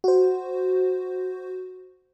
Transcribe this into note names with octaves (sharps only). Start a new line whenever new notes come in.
F#4 C5